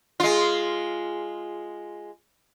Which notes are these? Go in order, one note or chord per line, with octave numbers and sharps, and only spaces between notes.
G#3 F4